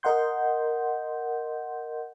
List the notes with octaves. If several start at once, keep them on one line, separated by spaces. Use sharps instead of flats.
A#4 D#5 F#5 C6 G6